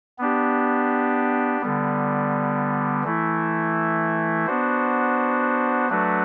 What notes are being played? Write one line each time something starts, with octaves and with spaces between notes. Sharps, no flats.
B3 D4 G4
D3 G3 B3
E3 A3 E4
B3 D4 F#4 C5
F#3 A3 D4 F#4 B4